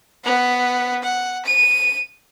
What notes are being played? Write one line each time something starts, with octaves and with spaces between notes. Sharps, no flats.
B3 F#5
F#5
D#7